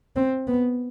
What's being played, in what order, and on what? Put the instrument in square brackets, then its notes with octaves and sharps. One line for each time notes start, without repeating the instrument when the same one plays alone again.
[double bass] C4
B3